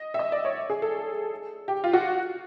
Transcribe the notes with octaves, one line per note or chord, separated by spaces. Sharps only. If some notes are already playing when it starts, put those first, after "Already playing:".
Already playing: D#5
E5
D#5
D5
C#5
G#4
A4
G4
F4
F#4